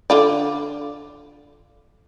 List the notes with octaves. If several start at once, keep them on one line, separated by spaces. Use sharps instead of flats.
D3 F4 D5